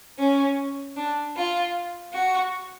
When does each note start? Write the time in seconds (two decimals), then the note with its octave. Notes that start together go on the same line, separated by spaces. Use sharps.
0.18 C#4
0.96 D4
1.35 F4
2.12 F#4